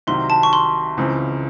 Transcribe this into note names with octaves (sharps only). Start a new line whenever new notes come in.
C2 C3 D#3 F#3 C6
A5
C#6
C6
C#2 C#3 E3 C4